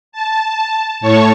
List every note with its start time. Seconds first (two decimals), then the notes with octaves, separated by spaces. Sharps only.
0.12 A5
1.01 A2 C#5 A5 C#6